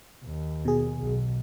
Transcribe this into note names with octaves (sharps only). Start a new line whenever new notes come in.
D#2
B2 G#4
B1